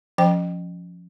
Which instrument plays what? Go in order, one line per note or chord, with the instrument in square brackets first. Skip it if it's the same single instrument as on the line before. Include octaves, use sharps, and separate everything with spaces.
[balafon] F3 C#4 C5 G5